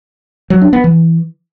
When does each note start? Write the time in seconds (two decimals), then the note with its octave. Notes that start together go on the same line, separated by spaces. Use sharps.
0.50 F#3
0.62 D4
0.73 B3
0.84 E3